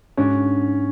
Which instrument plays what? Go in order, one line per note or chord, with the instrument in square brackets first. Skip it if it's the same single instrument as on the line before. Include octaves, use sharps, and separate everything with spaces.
[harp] G#2 G#3 D4 F#4 [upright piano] C#4